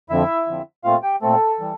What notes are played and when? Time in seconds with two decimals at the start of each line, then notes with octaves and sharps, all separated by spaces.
0.10 F2 D3 F3 C4 E4 E5
0.47 F2 D3 F3 C4
0.84 A#2 A3 C4 F4 F5
1.03 G4 G5
1.22 A#2 A3 C4 A4
1.60 E3 G3